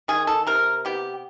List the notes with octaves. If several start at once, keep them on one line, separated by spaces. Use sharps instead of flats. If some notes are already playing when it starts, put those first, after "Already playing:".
D#3 G#4
A4
C3 A#4
B3 G4